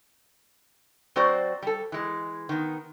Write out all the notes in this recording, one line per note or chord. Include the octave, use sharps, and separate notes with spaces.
F#3 C4 F#4 C5 D5
G3 A4
E3 G#3
D#3 B3